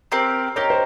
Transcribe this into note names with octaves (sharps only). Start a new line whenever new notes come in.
C4 G4 A#4
D#4 G4 A#4 C#5
C5